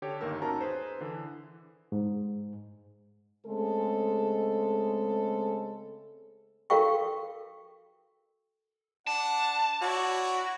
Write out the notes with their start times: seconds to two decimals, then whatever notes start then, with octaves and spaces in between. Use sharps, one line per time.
0.02 D3 G4 C#5
0.21 G1 D#2 D#3 A#3 A#4 E6
0.42 C#4 D#4 F#4 A#4 A5 A#5
0.61 G#4 B4 C5
1.01 D3 E3
1.92 G#2
3.46 C#3 G#3 A3 C4 G#4 A4
6.70 F#4 A4 A#4 F5 G5 C#6
9.07 D4 F#5 A5
9.82 E4 F#4 C#5 D5